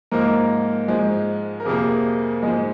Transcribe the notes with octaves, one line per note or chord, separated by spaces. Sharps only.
G#2 F3 A#3 A#4
G#2 F3 G#3
A#4
F2 C3 F3 A#3 G#4
G#2 F3 G#3